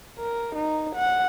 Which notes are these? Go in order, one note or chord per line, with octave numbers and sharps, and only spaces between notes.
A#4
D#4
F#5